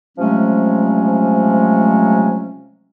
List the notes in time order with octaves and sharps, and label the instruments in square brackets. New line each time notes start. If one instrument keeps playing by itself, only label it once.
[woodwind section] C3 F3 F#3 G#3 A3 C#4